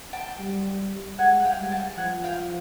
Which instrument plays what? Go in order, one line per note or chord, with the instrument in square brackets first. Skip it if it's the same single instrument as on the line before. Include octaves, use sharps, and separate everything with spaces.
[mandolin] G5 A5
[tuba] G3
[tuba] G#3 [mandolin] F#5 G#5
[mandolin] F#5
F5 G5
[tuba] G3
[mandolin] G#5
G5 A5
[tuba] F3 [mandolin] F#5 G#5
[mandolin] F5 G5